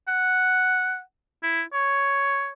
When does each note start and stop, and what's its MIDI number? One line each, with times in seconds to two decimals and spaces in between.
0.08 1.01 78
1.43 1.62 64
1.73 2.51 73